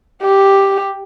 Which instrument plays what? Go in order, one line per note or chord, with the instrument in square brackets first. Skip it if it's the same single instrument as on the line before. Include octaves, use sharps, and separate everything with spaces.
[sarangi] G4